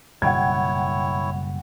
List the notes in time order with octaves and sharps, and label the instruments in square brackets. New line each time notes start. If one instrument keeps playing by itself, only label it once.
[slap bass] F#1 B2 G3 [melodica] E4 C#5 [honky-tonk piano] F#5 G5 G#6